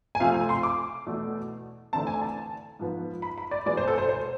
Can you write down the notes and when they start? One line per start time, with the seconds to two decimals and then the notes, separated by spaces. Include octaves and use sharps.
0.15 G#5
0.20 F2 C3 F3 A3 C4 F5
0.34 G#5
0.49 C6
0.63 D6
1.06 E2 B2 A3
1.93 E2 D3 A3 C4 A5
2.07 G#5
2.22 A5
2.79 G#2 F3 B3
3.22 B5
3.38 B5
3.51 D5
3.66 E2 B2 G#3 B3 D5
3.77 C5
3.88 A4
3.98 C5
4.09 C5